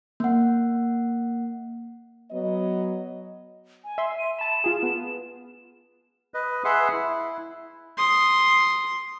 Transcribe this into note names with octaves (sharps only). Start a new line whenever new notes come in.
A#3 F#5
F#3 B3 D#5
G#5
E5 C6
D#7
A5 B5 E7
F4 G#4
B3
B4 D#5
G#4 B4 E5 F#5 C6
E4
C6 D#6